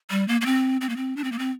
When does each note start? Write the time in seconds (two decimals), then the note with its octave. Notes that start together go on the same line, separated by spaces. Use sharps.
0.10 G3
0.28 A#3
0.41 A#3
0.46 C4
0.81 C4
0.89 A#3
0.97 C4
1.17 D4
1.24 C4
1.32 A#3
1.39 C4